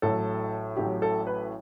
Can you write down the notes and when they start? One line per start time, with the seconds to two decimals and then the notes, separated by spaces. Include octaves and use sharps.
0.02 A1 A2 F#3 A4
0.77 A1 A2 F#3 G4
1.02 A4
1.27 B4